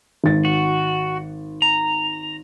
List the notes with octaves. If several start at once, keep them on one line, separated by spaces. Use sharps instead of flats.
G#1 A6
F#4
A#5